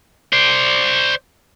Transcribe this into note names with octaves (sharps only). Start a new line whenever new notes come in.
C5 D5